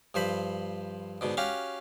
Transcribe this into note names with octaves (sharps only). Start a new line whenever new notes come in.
G2 F3 C5 B5
G#2 B2 D3
C#4 F#4 G4 F5